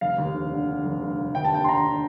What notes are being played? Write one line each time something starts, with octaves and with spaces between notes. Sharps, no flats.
F1 F5
D#2
F1
D3
D3
F1
F1
F1
D#2 G5
A5
D#2 G5
C6
D3 A#5
D3